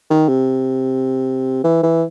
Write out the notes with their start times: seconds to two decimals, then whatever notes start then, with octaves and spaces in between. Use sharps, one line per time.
0.10 D#3
0.29 C3
1.64 E3
1.83 E3